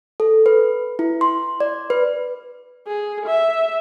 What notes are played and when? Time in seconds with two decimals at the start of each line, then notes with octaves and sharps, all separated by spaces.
0.20 A4
0.46 B4
0.99 E4
1.21 C6
1.60 D5
1.90 B4
2.87 G#4
3.26 E5